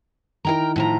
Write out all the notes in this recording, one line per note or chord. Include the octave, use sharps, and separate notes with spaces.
D#3 D#4 E4 A#4 G5 A#5
A2 F3 A#5